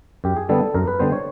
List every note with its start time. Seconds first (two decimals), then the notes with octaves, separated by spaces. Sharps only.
0.24 F#2 G4
0.37 G#4
0.49 D3 G3 B3 A4
0.74 F#2 A#4
0.88 B4
1.00 D3 G3 B3 C5
1.12 C#5